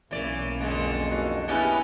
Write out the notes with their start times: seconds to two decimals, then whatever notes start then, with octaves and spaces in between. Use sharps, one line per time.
0.11 B1 E3 A#3 C#4 D5
0.60 F2 D3 G#3
1.11 E4 F#4 F5
1.48 B3 C#4 E4 G4 B4 D#5 G#5